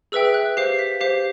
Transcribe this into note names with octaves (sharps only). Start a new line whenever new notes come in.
G#4 B4 E5 G5 E6
F#6
G4 C5 F5 C7
B6
G4 C5 F5 C7